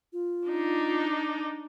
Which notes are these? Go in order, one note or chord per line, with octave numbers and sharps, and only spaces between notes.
F4
D4 D#4